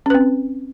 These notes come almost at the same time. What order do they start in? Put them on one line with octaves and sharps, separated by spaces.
C#4 B4 C4